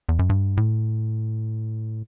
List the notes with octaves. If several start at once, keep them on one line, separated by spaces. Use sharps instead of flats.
E2
F#2
G2
A2